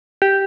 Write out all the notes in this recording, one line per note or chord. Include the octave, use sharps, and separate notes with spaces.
G4